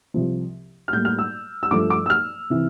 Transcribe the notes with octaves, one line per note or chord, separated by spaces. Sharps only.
C2 C3 F3
F6
A2 G3 A#3 G6
F6
E6
E6
G2 F3 A3 D6
D6
E6
F6
C3 E3